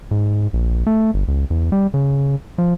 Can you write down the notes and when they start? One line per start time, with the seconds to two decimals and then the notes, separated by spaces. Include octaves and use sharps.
0.11 G#2
0.53 A#1
0.87 A3
1.14 G1
1.28 C#2
1.50 E2
1.72 G3
1.94 C#3
2.58 F3